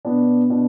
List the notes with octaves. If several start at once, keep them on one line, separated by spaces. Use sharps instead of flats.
B2 B3 D4
B2 B3 D4